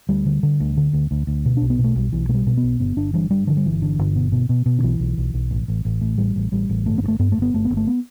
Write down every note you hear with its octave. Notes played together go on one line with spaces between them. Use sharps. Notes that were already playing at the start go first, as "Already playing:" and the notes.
D2 G3
D3
D3
D2
D3
D2
D2
D2
B2
B1 D4
B3
B2
A3
B1 G3
B1 E3
B2 A3
G3
B2
B3
B1
G1 B3
G1 D4
G2 E3
G2 G3
D3 E3
G3
G1 E3
D3
G1
B2
B2
B2
B2
D3
B1 E3
B1
B1
B1
A1
A1
A1
A2
A1 G3
A1
A1 G3
A1
G1 A3
B3
G2
A3
G2 B3
A3
G1 B3
G1 A3
B3
G1
A3
B3